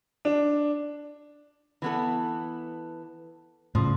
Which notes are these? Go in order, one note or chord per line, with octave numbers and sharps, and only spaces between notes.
D4
E3 B3 A4
A2 C#3 F3